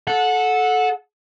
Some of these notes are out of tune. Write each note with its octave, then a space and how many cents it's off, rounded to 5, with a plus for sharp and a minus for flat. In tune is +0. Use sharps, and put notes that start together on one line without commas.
A4 -15 F#5 -20